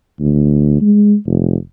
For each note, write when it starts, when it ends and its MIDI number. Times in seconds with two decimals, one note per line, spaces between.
0.20 0.76 38
0.81 1.15 56
1.26 1.56 29